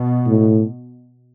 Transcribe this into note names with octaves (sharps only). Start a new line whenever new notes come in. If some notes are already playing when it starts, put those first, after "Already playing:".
Already playing: B2
A2